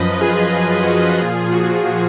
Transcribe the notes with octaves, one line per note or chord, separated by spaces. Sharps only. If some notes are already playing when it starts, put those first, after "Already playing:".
Already playing: F#2 F3 B4 D#5
F#2 F3 F4 G#4
F#2 F3
F#4
F#2 F3 F4 G#4
A#2 F3
G#4
A#2 F3 F#4
A#2 F3